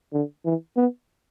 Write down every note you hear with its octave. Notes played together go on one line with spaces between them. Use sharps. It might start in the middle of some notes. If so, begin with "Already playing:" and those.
D3
E3
B3